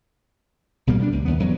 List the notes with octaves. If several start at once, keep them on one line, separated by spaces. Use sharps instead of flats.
B1 B2 G3 A#3
G3 D4
C#2
D#2 B3
E2 F#3